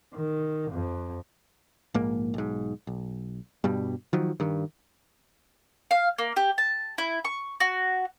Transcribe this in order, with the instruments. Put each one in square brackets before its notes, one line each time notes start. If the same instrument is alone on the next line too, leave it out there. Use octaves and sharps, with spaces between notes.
[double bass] D#3
F2
[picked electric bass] A#1 G#2 A#3
B1 G#2
B1
G2 B2 G3
D#3 F3 F#3
G2 D#3
[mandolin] F5
A#3
G4
A5
E4
C#6
F#4